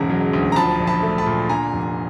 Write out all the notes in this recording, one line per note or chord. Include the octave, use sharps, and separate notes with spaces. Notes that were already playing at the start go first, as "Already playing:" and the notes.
Already playing: E1 G#2 C#3 A#5
F#3
D2
A#5
F3 A5 B5
A#1
A5 B5
A3
A5 B5
A#2
D3 G#5 A#5
F1